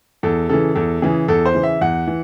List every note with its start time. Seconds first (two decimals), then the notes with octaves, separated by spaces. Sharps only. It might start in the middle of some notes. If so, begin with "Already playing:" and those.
0.23 E2 A4
0.49 C#3 E3 A4
0.75 E2 A4
1.02 C#3 E3 G#4
1.28 E2 A4
1.46 C5
1.54 C#3 E3
1.63 E5
1.81 E2 F#5
2.07 E3